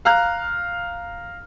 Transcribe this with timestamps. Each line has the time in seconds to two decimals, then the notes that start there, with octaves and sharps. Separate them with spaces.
0.05 F5 A#5 F6 F#6